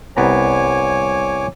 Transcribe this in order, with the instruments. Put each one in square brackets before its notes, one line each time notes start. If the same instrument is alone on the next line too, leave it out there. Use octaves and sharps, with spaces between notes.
[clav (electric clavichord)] C2 B3 A#5 [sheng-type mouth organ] C#5 G#5 D6